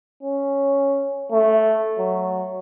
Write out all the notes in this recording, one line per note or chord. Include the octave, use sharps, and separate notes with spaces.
C#4
A3
F#3